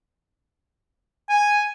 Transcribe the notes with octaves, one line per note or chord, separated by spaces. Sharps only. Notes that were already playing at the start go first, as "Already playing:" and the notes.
G#5